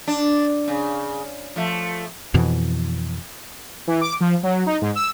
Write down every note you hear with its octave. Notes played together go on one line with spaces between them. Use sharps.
D4
C#3
F3 A3
F2 B2 E3
E3
D6
F3
F#3
D#4
G#2
E6